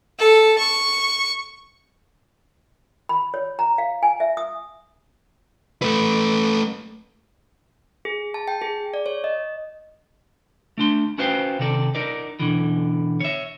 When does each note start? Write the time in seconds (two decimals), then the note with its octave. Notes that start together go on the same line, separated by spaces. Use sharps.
0.19 A4
0.58 C#6
3.09 B5
3.34 C#5
3.59 A#5
3.78 F5
4.03 G#5
4.20 E5
4.37 D#6
5.82 A3 B4
8.05 G#4
8.34 A5
8.48 G5
8.62 G#4
8.94 D5
9.06 C#5
9.24 D#5
10.78 A3 D4 C6
11.18 C#4 F#4 B4 C5 F5 G5
11.59 C3 D#3 A4 D5
11.95 D#4 A#4 D5
12.40 B2 D3 E3
13.20 C#5 E5